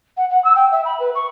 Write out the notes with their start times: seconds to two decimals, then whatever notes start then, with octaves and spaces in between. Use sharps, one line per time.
0.17 F#5
0.30 F#5
0.44 E6
0.55 G5
0.71 E5
0.85 B5
0.99 B4
1.15 C#6